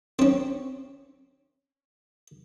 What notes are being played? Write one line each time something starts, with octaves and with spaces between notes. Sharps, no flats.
C4 C#4